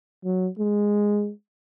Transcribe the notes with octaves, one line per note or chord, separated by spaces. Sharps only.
F#3
G#3